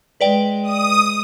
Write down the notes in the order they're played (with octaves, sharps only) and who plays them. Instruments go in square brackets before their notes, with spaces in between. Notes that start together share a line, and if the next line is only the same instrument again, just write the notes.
[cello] G#3 [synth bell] B4 D5 G5
[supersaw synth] D#6